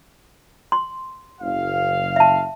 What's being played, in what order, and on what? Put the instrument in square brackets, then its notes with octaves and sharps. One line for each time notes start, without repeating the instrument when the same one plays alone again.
[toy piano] C6
[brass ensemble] F#1 F5
[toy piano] E5 A5